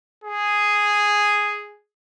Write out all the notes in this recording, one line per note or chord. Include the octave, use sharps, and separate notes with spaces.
G#4